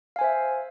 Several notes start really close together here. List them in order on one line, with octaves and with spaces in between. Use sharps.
F5 G#5 C5 E5